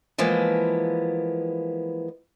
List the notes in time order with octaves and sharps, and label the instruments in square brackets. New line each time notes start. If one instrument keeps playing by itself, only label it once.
[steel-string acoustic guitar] E3 F3 G#3 A#3 B3